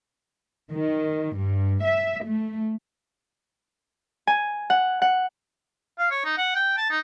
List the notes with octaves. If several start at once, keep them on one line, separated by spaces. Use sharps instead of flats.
D#3
G2
E5
A3
G#5
F#5
F#5
F5
C#5
D#4
F#5
G5
A5
D#4